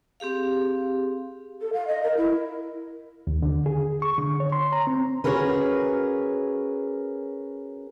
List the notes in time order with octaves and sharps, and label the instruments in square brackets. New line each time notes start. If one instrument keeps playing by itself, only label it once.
[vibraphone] C4 G4 G#4 F5
[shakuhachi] A4
F5
D#5
A#4
E4
[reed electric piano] D#2
D3
G#4
C#6
D3
C#5
C6
A#5
C4
[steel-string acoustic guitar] C#4 F#4 G#4 A#4 B4